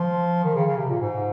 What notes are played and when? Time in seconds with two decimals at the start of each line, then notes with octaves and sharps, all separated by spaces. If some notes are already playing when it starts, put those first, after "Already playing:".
Already playing: F3
0.44 D#3
0.55 C#3
0.66 C#3
0.78 C3
0.89 A#2
1.01 G#2